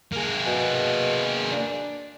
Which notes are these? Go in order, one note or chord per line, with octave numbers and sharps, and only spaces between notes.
A#3 G#4
B2
D4